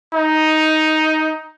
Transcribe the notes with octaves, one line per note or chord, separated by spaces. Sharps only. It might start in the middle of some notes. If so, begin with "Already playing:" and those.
D#4